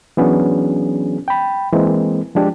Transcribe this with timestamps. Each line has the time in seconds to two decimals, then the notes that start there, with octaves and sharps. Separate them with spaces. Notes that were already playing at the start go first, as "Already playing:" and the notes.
0.17 E3 F#3 B3 C#4 D4 G#4
1.28 G5 B5
1.72 E3 G#3 A#3 C4
2.35 F3 G#3 D4 G4